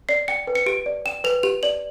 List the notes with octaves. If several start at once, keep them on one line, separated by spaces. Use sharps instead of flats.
D5 C7
G5 C#7
B4
C#7
G4 D7
D5
G5 E7
B4 F7
G4 F7
D5 F#7